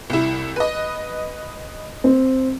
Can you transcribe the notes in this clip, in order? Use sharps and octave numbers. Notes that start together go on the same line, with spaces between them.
C2 E4
B4 D#5
C4